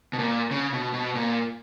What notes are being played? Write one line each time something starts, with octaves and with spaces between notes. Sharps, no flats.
B2
A#2
C#3
B2
B2
A#2